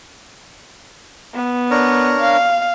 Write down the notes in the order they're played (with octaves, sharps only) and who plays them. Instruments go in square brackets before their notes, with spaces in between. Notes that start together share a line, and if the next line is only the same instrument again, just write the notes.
[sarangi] B3
[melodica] D4 A#4 C#5
[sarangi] F5